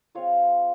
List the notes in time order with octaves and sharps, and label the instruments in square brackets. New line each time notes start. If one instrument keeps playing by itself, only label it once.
[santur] G#3 C4 F4 C#5 F5